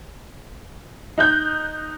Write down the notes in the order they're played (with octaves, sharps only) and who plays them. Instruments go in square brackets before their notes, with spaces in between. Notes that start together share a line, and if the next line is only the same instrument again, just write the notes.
[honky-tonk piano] D#4 F#6 G6